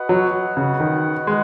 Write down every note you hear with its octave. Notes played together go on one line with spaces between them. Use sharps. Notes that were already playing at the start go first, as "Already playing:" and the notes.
Already playing: F#4 B4 D#5 F#5
F#3
C#3
D#3
G#3